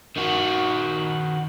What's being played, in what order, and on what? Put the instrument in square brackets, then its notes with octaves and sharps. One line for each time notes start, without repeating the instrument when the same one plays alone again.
[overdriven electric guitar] D#3 F#4